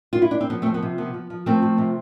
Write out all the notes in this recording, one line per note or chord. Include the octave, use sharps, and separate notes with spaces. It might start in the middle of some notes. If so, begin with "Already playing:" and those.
F4
E4
D4
C4
F3 B3
A3 C4
F3
B3
C3
F3 B3
F3
F3
F3 A3 C4
F3
C3